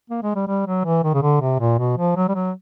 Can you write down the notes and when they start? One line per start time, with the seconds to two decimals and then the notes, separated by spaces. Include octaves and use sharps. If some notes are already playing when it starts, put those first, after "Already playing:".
0.10 A#3
0.23 G#3
0.35 G3
0.47 G3
0.66 F#3
0.85 E3
1.04 D#3
1.14 C#3
1.22 D3
1.41 C3
1.60 A#2
1.79 B2
1.98 F3
2.16 F#3
2.29 G3
2.35 F#3